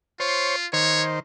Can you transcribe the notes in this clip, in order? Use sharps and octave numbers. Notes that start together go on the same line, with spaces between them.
F4 C5 C#5
D#3 C5 C#5